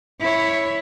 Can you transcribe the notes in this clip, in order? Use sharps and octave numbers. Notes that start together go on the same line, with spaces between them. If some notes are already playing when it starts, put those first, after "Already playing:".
E4 C#5